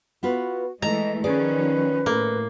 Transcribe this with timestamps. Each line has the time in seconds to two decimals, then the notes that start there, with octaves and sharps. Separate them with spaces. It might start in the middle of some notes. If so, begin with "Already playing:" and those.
0.23 B3 F4 F#4 B4
0.82 E3 G#3 A3 A4 D#5 A#5
1.24 D#3 F3 C#4 G#4 B4 D5
2.06 A2 A#3